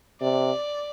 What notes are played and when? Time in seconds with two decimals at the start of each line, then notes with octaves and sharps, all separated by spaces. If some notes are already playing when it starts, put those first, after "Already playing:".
0.21 C3 D5